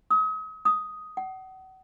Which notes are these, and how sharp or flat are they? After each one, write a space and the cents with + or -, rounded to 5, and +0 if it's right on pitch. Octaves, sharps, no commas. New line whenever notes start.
D#6 +40
D#6 +5
F#5 +35